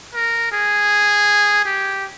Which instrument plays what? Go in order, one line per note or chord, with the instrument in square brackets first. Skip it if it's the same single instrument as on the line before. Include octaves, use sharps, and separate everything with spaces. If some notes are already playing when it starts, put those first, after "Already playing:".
[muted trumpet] A#4
G#4
G4